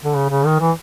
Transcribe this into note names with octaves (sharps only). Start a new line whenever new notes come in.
D3
C#3
C#3
D#3
E3